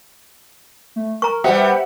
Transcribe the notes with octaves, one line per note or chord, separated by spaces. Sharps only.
A3
A#4 A#5 C#6
G3 B3 G4 C5 E5 F#5